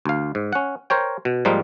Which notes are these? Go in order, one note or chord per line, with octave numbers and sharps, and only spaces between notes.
D2 F5
G#2
C#4 F#5
A#4 C5 C#5 G5
B2
G#2 F3 G3 A#3 D#4 F4